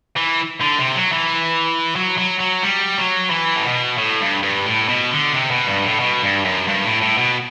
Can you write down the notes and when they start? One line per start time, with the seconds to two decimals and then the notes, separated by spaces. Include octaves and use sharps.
0.16 E3
0.61 D3
0.79 C3
0.96 F#3
1.12 E3
1.96 F#3
2.18 F#3
2.40 F#3
2.63 G3
2.97 F#3
3.30 E3
3.56 A2
3.65 B2
3.98 A2
4.21 G2
4.43 G2
4.66 A2
4.88 B2
5.11 D3
5.33 C3
5.51 B2
5.67 G2
5.84 A2
6.00 B2
6.22 G2
6.45 F#2
6.68 G2
6.85 A2
7.02 A2
7.18 B2